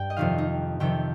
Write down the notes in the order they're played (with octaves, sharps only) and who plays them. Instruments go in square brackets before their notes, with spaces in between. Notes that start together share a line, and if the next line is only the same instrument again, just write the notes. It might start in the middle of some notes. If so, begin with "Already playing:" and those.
Already playing: [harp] G2 G5
D#5
F2 C3 D#3 F5
D#4
F2 C3 D#3 G5